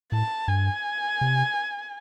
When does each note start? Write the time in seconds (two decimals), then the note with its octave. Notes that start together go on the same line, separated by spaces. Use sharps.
0.12 A2 A5
0.48 G2 G#5
1.21 C3